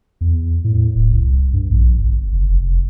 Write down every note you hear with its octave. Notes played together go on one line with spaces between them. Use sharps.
E2
A2
D1
C2
G2
A#1
G1
F#1
F1